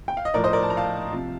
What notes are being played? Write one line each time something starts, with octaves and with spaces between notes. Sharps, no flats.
G5
F5
D#5
A2 F3 A#4 D5
C5 D#5
A#4 D5
A5
A#5
F5 A5
C3 F3